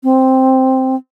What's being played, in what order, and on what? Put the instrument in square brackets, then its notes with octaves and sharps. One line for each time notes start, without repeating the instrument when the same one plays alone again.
[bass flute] C4